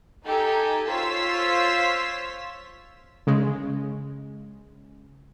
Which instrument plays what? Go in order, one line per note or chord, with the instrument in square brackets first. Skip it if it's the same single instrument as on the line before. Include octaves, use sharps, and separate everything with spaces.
[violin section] D#4 G4 A4 G#5
F4 C5 C#5 C6 E6 B6
[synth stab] C#3 G#3